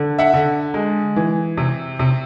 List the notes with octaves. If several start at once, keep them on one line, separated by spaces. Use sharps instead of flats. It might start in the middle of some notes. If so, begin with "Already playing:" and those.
Already playing: D3
E5 F#5
D3
G#3
E3
C3
C3